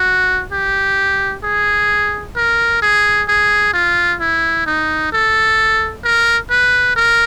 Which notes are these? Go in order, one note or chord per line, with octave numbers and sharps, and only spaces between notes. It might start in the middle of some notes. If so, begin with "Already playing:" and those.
Already playing: F#4
G4
G#4
A#4
G#4
G#4
F4
E4
D#4
A4
A#4
B4
A#4